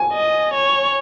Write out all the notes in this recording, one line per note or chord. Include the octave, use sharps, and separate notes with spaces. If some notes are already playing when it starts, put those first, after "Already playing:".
Already playing: G#5
D#5
C#5